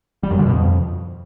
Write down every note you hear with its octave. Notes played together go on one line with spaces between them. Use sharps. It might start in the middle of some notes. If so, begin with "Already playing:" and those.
G3
F#2
D3
B2
F2